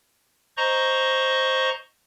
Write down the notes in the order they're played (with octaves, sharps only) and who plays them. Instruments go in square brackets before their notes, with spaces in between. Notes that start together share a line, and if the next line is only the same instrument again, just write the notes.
[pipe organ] C5 D#5 A#5 C#6